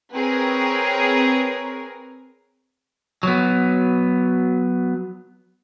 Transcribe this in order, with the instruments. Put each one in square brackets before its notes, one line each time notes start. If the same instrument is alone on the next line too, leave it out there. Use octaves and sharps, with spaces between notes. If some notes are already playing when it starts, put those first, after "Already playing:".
[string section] C4 G#4 A#4 B4 C#5
[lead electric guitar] F#3 B3